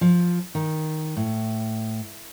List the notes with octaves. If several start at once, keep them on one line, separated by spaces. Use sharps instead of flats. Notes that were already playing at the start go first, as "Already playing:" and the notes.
F3
D#3
A2